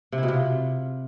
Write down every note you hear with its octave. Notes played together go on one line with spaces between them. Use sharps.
C3
E4
B2
C3
F4